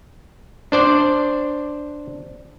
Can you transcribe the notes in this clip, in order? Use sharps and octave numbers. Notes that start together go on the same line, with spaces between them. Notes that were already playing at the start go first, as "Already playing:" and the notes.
D4 C5 D5